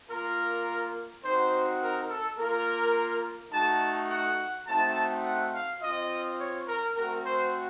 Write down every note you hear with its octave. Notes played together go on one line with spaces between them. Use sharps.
A#3 F4 A#4
C4 D#4 F#4 C5
A#4
A4
A#3 F4 A#4
A3 D#4 F#4 A5
F#5
A3 C4 D#4 F#4 A5
F#5
F5
C4 F4 D#5
C#5
A#4
A3 C4 F#4 A#4
C5